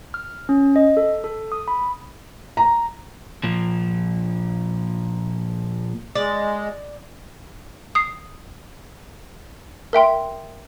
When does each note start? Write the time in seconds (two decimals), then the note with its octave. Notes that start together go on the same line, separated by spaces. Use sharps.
0.14 F6
0.49 C#4
0.76 D#5
0.97 A4
1.24 A4
1.52 D#6
1.68 B5
2.57 A#5
3.44 A#2 F3
6.15 G#3 D5
7.95 D#6 C7
9.93 A#4 E5 G5 C6